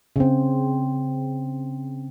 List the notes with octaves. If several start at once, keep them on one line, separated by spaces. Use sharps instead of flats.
C#3 C4